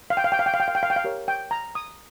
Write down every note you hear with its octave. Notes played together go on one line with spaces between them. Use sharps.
F5
G5
F5
G5
F5
G5
F5
G5
F5
G5
F5
G5
F5
G4 A#4 C#5
G5
A#5
D#6